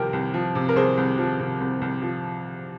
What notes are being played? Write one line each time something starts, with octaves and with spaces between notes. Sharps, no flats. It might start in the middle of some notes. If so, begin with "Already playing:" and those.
Already playing: C2 C3 F3 G4 A#4
C2
F3
C3
A#4
C2 G#4 C5
C2
F3
C3
C2
C2
F3